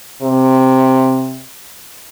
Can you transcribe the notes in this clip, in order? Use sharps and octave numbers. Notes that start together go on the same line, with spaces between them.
C3